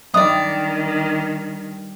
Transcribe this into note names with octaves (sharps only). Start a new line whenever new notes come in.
G2 D#3 F#3 G3 D5 D#5 D#6